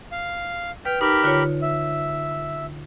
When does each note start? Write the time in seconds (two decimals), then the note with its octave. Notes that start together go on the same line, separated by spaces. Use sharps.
0.12 F5
0.85 B4 G5 F6
1.01 D#4 G4 A#4 B5
1.23 D3 F4 C#5
1.62 E5